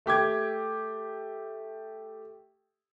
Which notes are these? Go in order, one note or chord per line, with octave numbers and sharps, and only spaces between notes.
A3 G4 D6 G#6